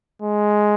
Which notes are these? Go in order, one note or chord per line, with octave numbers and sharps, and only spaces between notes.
G#3